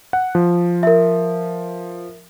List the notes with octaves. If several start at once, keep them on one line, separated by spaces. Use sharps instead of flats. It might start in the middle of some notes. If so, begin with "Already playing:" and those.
F#5
F3
A#4 E5